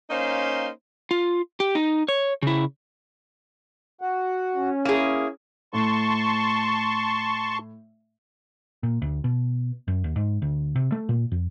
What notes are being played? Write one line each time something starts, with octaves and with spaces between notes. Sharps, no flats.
A#3 C#4 D#4 C5 F5 C6
F4
G4
D#4
C#5
C#3 E4
F#4 F#5
C#4
A#3 E4 G#4
A2 A5 C6 C#6
A#2
D2
B2
F#2
D#2
G#2
D2
C3
A3
A#2
F2